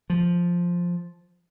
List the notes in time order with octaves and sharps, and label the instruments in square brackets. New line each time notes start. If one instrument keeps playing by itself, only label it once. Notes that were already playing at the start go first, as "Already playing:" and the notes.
[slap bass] F3